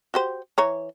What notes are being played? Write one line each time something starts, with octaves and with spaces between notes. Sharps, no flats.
F#4 G4 C5
E3 C#5 A#5